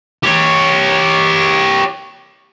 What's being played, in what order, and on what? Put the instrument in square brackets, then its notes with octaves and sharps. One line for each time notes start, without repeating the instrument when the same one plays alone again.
[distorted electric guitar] G4 C#5